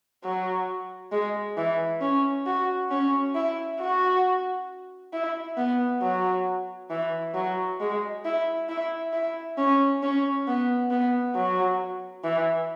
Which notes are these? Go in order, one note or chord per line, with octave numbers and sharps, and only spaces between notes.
F#3
G#3
E3
C#4
F#4
C#4
E4
F#4
E4
B3
F#3
E3
F#3
G#3
E4
E4
E4
C#4
C#4
B3
B3
F#3
E3